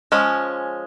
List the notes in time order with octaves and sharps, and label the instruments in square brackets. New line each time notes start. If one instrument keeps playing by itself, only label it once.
[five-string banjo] F3 G#3 C#4